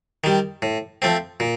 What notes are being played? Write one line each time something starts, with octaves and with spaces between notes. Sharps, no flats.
D#3 G3
A2
F3 A3 C4
A#2